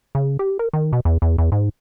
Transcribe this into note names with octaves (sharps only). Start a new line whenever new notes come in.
C#3
G4
A#4
D#3
B2
E2
E2
E2
G#2